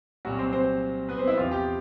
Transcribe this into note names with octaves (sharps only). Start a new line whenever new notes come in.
C2 A#2 F#3 F#4
C4 C5
C4 C5
B3 B4
C4 C5
E4 E5
E2 C3 F3 F4 F5
G4 G5